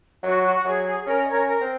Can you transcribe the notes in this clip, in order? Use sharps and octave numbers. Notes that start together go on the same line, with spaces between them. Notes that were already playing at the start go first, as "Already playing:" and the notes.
F#3 F#4
F#4
F#4
F#3 G#4
G#4
G#4
C#4 A#4
D#5
A#4 C#5
C#4
A#4
C4